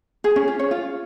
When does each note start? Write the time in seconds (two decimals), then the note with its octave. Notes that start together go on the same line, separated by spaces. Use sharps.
0.24 G#4
0.36 C#4
0.48 F4
0.59 C#5
0.71 F4